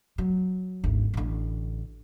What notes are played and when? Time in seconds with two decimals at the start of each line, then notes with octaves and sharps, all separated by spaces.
0.18 F#3
0.84 G#1 D2
1.14 A1 D3